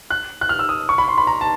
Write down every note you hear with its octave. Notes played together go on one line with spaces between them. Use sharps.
F#6
F#6
F6
E6
D#6
C#6
B5
C6
B5
A#5
A5